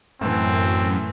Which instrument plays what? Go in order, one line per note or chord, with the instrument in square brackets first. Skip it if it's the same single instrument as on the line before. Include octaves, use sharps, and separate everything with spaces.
[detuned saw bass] F#2 [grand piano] A2 E3 [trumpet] C4